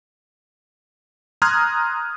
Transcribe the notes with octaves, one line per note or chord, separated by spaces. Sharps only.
A#5 C6 D#6 F6 F#6 G#6